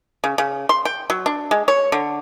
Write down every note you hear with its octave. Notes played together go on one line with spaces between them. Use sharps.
C#3
C#3
C6
G5
F#3
D4
G#3
C#5
D3